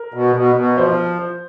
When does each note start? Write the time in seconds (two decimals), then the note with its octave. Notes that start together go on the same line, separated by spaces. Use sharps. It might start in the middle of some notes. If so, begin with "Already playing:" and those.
Already playing: A#4
0.14 B2
0.36 B2
0.56 B2
0.78 F3 C5